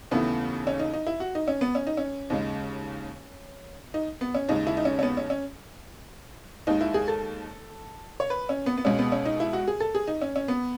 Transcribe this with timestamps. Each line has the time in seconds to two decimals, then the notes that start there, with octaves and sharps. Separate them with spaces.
0.11 D#2 C#3 E3 A3 B3
0.67 C#4
0.80 D#4
0.94 D#4
1.07 E4
1.20 F#4
1.35 D#4
1.48 C#4
1.61 B3
1.75 C#4
1.87 D#4
1.97 C#4
2.30 D#2 C#3 G#3
3.94 D#4
4.21 B3
4.34 C#4
4.49 D#2 C#3 G#3 D#4
4.67 E4
4.77 D#4
4.85 C#4
4.99 C#4
5.03 B3
5.17 C#4
5.30 C#4
6.67 D#2 D#3 G#3 D#4
6.81 E4
6.94 G#4
7.08 A4
8.20 C#5
8.30 B4
8.49 C#4
8.66 B3
8.77 B3
8.85 C#2 B2 G#3 C#4
8.99 B3
9.12 C#4
9.25 D#4
9.40 E4
9.53 F#4
9.68 G#4
9.80 A4
9.95 G#4
10.08 D#4
10.21 C#4
10.36 C#4
10.48 B3